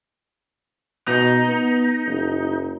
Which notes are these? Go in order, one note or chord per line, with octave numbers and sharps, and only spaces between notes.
B2 D#4
B3
F#1